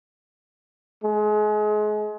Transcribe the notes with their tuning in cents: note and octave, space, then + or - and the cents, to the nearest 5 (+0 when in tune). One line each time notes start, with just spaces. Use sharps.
G#3 +30